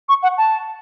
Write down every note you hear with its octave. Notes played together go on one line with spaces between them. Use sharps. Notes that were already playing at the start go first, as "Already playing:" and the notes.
C#6
F#5
A5